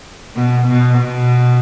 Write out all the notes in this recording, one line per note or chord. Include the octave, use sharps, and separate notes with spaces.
B2
B2
B2